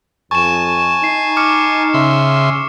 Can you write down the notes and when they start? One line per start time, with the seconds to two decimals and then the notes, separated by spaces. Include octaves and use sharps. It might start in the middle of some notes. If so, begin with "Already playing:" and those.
0.31 F2 G#5 A5 C#6 E7
1.04 D#4 C7
1.37 D6 F6 C#7
1.94 C#3 E5 C6